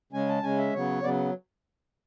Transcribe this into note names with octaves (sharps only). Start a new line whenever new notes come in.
C#3 G#3 C#4 G#5
A5
C#3 G#3 C#4 G#5
E5
C#3 F#3 B3 C#5
C#3 F#3 B3 D5